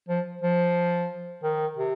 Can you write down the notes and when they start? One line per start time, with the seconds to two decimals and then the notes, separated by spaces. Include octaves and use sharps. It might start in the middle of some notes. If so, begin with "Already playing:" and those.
0.08 F3
0.41 F3
1.43 D#3
1.77 C3